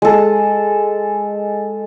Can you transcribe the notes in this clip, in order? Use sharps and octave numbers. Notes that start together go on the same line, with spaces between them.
G#3 A4